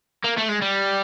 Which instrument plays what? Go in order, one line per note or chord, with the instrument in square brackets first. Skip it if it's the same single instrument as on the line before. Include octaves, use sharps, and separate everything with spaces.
[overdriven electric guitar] A#3
A3
G#3
G3